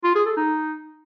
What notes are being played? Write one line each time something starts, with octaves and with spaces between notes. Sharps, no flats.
F4
G#4
A4
D#4